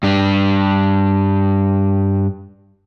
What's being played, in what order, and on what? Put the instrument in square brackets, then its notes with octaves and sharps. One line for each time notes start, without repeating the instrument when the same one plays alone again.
[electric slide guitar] G2 D4